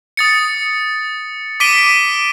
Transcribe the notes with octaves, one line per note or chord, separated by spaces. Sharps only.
D#6 A6 C#7
D6 B6 D7 D#7 G7